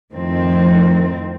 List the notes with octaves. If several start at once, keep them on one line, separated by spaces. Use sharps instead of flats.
F2 A2 D#3 F3 C4